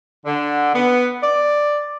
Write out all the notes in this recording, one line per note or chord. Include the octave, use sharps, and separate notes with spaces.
D3
B3
D5